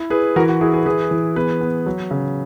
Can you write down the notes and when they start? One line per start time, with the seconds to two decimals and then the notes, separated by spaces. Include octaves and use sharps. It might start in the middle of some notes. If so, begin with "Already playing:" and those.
Already playing: E4
0.10 E4 G#4 B4
0.36 E3 F#4 A#4
0.49 F#4
0.61 E4 G#4
0.73 G#4 B4
0.86 E3 G#4 B4
1.11 E3
1.36 B3 G#4 B4
1.61 B3
1.86 F#3
2.11 C#3